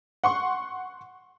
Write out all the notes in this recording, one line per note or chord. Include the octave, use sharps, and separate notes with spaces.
F#5 C6 C#6